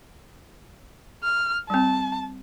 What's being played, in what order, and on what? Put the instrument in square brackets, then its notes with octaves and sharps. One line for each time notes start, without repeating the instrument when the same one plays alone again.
[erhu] F6
[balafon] G3 C4 [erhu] A5